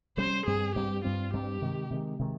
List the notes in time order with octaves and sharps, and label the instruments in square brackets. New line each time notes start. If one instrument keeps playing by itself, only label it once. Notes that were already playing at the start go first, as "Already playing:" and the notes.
[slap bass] C3 G3 C#4 [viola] C5
[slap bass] G2 G3 C4 [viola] G#4
[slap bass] G2 G3 C4 [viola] G4
[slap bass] G2 G3 C4 [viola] F4
[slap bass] G2 G3 C4 [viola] G4
[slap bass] C3 D#3 G#3
C3 D#3 G#3
C3 D#3 G#3